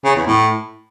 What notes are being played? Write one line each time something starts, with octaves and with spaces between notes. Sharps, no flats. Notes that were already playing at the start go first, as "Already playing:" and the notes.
C#3
E2
A2